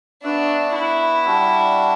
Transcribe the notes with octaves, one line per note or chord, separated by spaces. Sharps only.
B3 D4 F#4 B4 E5
E4
G3 D4 F#4